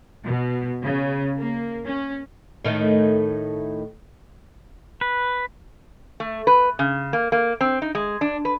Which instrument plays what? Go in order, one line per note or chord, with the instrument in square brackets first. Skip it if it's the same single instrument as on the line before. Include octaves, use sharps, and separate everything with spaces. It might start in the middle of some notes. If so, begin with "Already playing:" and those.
[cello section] B2
C#3
A#3
C#4
[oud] A2 D#3 A3
[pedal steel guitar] B4
[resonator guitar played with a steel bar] A3
B4
C#3
A#3
A#3
C4
D#4
G#3
D4
B4